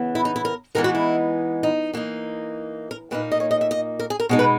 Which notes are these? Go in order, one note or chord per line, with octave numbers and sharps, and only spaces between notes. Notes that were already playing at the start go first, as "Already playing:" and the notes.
Already playing: C#3 E3 B3
E4
D#4
E4
A#4
E3 G#3 B3 D#4 A#4
F#4
E4
D#4
E3 A#3 D#4
A#4
A#2 A#3 D#4 B4
D#5
C#5
D#5
E5
D#5
A#4
G#4
A#4
B2 G#3 D#4
B4